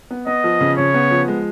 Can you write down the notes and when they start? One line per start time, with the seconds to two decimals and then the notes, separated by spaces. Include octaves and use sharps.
0.11 B3
0.27 B3 D#5
0.44 F3
0.61 C#3
0.78 C#3 C#5
0.94 B3
1.11 F3
1.28 G#3